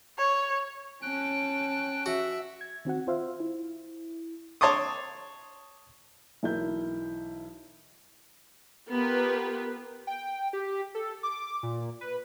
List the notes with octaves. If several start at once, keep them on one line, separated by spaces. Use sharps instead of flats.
C#5
C#4 G5 A5 F#6
F#4 E5
G#6
D#3 C4 F#4 F#5
F4 C5 E5 F5
E4
C#5 A5 C6 D6 D#6
B1 E3 E4 A#4 G6
B3 F4 G4 A#4 B4
G5
G4
A4
D6
A#2
B4